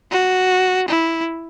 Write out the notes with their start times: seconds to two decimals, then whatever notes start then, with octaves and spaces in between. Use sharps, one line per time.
0.11 F#4
0.88 E4